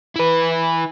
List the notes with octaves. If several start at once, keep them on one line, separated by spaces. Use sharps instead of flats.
E4 B4